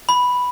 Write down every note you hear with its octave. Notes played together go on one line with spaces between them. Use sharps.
B5